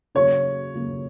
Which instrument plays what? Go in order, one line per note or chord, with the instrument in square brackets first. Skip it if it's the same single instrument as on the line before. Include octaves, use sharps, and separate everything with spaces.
[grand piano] C#3 F#3 A#3 [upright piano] C#5
[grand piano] C#3 F#3 A#3